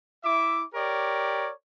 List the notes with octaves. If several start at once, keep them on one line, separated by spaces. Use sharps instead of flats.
E4 E5 D6
G4 A#4 C#5 D5